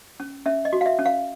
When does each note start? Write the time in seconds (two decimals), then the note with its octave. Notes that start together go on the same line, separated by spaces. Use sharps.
0.20 C#4
0.46 C#4 E5
0.65 D#5
0.73 F#4
0.81 F5
0.86 E5
0.99 C#4
1.05 F5